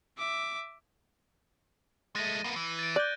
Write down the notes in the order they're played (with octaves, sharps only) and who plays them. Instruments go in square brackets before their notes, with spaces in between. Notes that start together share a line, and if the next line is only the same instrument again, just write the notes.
[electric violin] E5 D6
[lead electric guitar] G#3 A3 [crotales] A6 A#6 D#7
[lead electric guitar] A#3 B3
E3
[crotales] A6 D7
[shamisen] D5 [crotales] F#6 G6 G7